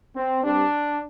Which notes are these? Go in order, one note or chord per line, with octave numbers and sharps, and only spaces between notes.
C4
G2 G3 C4 D4